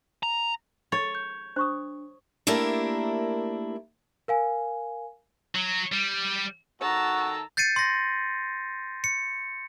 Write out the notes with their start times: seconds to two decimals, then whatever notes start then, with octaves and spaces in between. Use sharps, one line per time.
0.23 A#5
0.92 C#5 A6
1.15 G6
1.56 D4 C5 C#6 D#6
2.47 A3 A#3 D4 E4 G4 A#4
4.28 A#4 F5 G#5
5.56 F#3
5.94 G3
6.82 D#3 F#4 A4 A5 A#5 E6
7.57 G6 A6 C7 C#7 D#7
7.76 C6 A#6
9.04 C#7